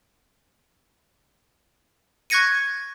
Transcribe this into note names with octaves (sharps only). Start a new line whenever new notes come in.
C#6 F#6 G#6 A#6 C#7 D#7